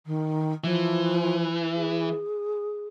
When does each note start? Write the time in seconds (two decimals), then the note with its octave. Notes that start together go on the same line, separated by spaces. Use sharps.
0.06 D#3
0.64 E3 F3
1.76 G#4